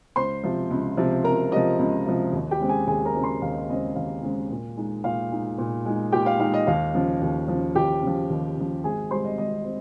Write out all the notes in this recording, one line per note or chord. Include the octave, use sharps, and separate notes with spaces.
C#2 C5 C6
C3 F3
C#2
C3 F3
C#2 A#4 A#5
C3 F3 D#5
C#2
C3 F3
D#2
G4 G5
C#3 G#3 C4
G#4 G#5
D#2 G#4 G#5
A#4 A#5
C#3 G#3 C4
C5 C6
D#2 F5
D#5
C#3 G#3 C4 D#5
D#2 F5
C#3 G#3 C4
A#2
G#3 D#4
A#2 F5
G#3 D#4
A#2
G#3 D#4
A#2 G4 G5
F5
G#3 D#4 F5
D#5
D#2 F5
C#3 F3
D#2
C#3 F3
D#2 G4 G5
C#3 F3
D#2
C#3 F3
G#1 G#4 G#5
G#2 G3 C4 C5 C6
D#5
G#1 D#5
C4